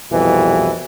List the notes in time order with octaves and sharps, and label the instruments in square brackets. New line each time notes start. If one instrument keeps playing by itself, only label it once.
[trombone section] C2 F2 B2 E3